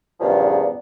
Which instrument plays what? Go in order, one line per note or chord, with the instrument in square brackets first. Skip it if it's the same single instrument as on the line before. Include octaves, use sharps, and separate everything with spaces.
[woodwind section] E2 G2 A#2 C#3 F3 B3